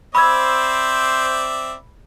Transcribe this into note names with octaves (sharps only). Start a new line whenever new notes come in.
C4 C5 D5 E5 B5 E6 G#6